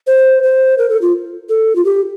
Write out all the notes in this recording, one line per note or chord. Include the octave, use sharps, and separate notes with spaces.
C5
C5
A#4
A4
F4
A4
F4
G4